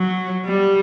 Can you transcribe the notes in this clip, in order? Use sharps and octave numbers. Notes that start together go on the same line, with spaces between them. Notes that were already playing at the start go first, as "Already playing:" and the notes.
Already playing: F#3
G3